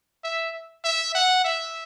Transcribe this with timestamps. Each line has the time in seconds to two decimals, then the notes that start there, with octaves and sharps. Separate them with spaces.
0.24 E5
0.84 E5
1.15 F#5
1.44 E5